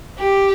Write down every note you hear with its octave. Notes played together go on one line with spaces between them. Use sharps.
G4